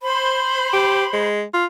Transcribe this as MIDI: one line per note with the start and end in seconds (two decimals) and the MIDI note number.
0.01 1.28 72
0.01 1.28 83
0.73 1.05 67
1.13 1.43 56
1.54 1.65 65